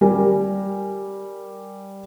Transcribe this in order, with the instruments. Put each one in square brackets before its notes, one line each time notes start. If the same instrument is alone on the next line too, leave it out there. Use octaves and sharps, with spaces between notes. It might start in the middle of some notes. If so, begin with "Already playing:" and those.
[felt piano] G3 A#4 G#5